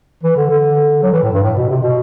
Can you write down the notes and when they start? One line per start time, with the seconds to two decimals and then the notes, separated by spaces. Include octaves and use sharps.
0.23 E3
0.36 D3
0.49 D3
1.02 F#3
1.13 E3
1.22 A2
1.33 G2
1.42 A2
1.56 B2
1.69 C3
1.82 B2